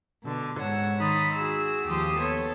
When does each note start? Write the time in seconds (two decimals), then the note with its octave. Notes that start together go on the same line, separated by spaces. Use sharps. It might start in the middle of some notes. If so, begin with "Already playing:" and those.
0.23 B2 D3
0.59 G#2 C#5 F#5 E6
0.99 D#3 D#4 B5 C6 D#6 A6
1.33 F#4 G#4 E6
1.87 D#2 F3 G4 C6 D#6 E6
2.18 B3 A4 C#5